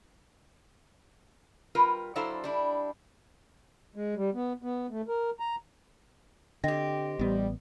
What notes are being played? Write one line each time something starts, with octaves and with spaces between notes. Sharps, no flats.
G3 F4 A#4 B4
F#3 D4 E4 A4 C5 F5
G3 D4 E4
G#3
G3
B3
B3
A3
A#4
A#5
D3 C4 G4 D#5 G5 A#6
A1 G3 B3